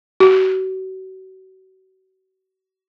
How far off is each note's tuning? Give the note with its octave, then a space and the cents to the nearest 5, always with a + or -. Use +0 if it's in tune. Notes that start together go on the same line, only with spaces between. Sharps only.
F#4 +35